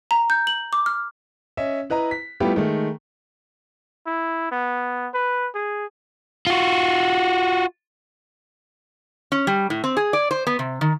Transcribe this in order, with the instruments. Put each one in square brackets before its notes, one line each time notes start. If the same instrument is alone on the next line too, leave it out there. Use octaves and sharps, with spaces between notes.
[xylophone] A#5
G6
F#7
D6
F6
[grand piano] C#4 D#5 E5
E4 B4 D#5 A#5
B6
G3 A3 B3 E4 F4 G4
D#3 G#3 A3
[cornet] E4
B3
B4
G#4
[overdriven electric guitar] F4 F#4
[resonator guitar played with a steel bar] C#4
G3
A2
C4
G#4
D5
C5
B3
C3
D#3